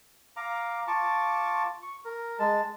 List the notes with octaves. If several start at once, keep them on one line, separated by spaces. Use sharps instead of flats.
F5 A#5 D6
F4 A5 C#6 D6
C#6
A#4
G#3 A5